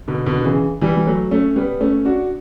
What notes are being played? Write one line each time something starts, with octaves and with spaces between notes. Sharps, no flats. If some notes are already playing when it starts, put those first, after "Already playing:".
B2 D3
B2 D3
D3
C#3 E3
E3 G3
G3
F#3 A3
A3 C#4
G3 B3
A3 C#4
D4 F#4